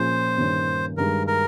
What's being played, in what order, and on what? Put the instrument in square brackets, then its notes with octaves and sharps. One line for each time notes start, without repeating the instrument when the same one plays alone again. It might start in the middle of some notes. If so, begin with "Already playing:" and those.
Already playing: [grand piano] A#2 F3 A#3 C#4 G#4 [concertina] C5
[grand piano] G2 D#3 A#3 C#4
[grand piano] G2 D#3 G#3 [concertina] A#4
[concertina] A#4